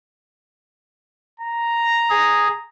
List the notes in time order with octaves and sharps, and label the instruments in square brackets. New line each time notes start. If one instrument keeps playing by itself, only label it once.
[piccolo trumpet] A#5
[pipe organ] G#4